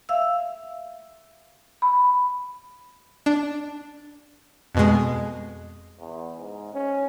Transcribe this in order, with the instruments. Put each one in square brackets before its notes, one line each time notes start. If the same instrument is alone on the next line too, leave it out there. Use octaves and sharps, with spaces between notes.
[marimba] E5 F5 E6
B5
[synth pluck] D4
F2 B2 G#3
[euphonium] E2
G#2
C#4